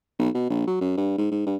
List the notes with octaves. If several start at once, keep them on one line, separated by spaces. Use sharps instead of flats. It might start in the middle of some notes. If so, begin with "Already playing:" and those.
B1
B2
A#1
F#3
F#2
G2
G#2
G#2
G2